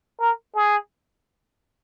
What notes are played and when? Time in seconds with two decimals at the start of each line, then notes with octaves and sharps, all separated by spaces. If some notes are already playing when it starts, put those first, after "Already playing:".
0.20 A#4
0.56 G#4